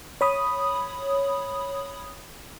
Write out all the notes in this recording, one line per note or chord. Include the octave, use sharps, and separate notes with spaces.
C#5 B5 D#6